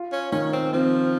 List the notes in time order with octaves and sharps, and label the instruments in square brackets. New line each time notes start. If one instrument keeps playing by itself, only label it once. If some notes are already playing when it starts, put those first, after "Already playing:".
Already playing: [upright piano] F4
[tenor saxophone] C#4
[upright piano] D#3 [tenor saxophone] C#4
[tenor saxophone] C4
[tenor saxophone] F3 [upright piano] C4